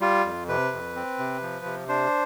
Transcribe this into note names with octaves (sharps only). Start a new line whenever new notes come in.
G3 F4
F2
C3 B4
F2
C4
C3
F3
C3
D4 C5